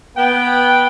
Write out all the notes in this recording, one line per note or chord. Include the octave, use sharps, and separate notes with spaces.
B3 G5